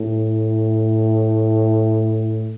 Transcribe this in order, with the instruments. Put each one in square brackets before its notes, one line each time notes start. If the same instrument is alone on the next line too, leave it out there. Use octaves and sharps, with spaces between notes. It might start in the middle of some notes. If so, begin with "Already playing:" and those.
Already playing: [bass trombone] A2